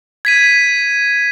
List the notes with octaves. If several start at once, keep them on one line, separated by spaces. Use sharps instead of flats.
G#6 B6 D#7